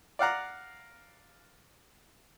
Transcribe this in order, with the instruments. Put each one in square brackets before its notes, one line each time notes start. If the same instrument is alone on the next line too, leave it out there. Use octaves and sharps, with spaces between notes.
[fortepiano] D5 F5 F#5 A#5